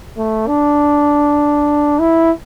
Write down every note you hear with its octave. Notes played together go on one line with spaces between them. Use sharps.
A3
D4
E4